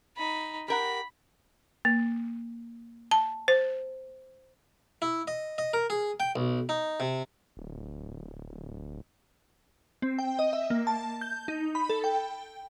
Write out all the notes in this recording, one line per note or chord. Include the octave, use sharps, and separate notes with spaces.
D#4 B5
G4 A#4 F#5 B5
A#3
A5
C5
E4
D#5
D#5
A#4
G#4
G5
B1
D#4
C3
D1
C4
G5
D#5
E5
A#3
A5
G6
D#4
B5
A4
G5